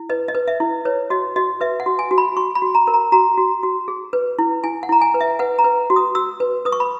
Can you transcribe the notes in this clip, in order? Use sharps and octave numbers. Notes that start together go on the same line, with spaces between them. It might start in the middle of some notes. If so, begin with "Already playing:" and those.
Already playing: E4
B4 D#5
D#5
B4
E5
E4
B4 C#5
F#4 D#5
F#4 D#5
B4 E5
F#5
F#4
G#5
F#4
B5
F#4 C#6
B5
F#4
A#5
A#4
A#5
F#4 A#5
F#4
F#4
G#4
B4
E4
E4 G#5
F#5
E4 A#5
G#5
B4
E5
B4 F#5
A#5
B4
F#4
D#6
F#4 E6
B4
B4 D#6
C#6
B5